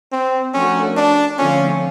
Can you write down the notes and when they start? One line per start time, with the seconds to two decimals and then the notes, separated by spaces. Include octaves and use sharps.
0.12 C4
0.54 F3 A3 C#4 D4 F#4 A#4
0.97 D4
1.38 D3 F3 A3 C4 C#4 F4